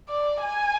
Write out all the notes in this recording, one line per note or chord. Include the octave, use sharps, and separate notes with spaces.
D5
G#5